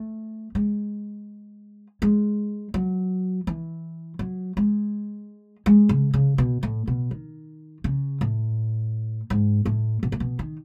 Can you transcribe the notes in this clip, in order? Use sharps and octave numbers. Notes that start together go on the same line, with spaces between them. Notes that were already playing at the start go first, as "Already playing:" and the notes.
Already playing: A3
G#3
G#3
F#3
E3
F#3
G#3
G#3
C#3
C#3
B2
A2
B2
D#3
C#3
A2
G#2
A2
B2
A2
B2
D#3